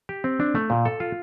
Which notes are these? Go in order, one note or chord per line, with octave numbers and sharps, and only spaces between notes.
G4
C4
D4
A3
A#2
A4
F4